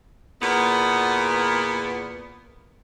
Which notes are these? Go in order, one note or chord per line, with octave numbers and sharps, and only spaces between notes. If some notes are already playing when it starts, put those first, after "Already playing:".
E2 A#2 B3